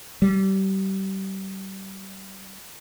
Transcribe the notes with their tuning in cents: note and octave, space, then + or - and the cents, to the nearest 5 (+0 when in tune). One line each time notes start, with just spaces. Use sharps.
G3 -30